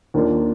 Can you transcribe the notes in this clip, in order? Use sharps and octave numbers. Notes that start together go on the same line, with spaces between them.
D#2 D#3 A#3 D4 F4